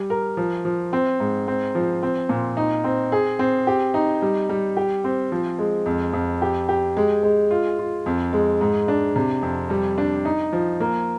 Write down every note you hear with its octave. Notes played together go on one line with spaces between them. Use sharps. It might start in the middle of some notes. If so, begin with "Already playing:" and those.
Already playing: G3
A#4
F3
F3
C4
G#2
C4
F3
C4
A#2
D#4
C4
G#4
C4
G4
D#4
G3
G3
G4
C4
F3
G#3
F2
F2
G4
G4
G#3
G#3
F4
F4
F2
G#3
G#2
D4
C3
F2
G3
D4
D#4
F3
A#3